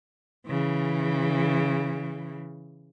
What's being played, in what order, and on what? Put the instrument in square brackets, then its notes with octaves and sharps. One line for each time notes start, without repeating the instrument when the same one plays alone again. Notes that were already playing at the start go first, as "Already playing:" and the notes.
[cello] C#3 E3